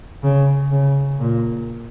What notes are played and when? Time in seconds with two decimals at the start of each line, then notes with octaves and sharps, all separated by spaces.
0.23 C#3
0.71 C#3
1.19 A#2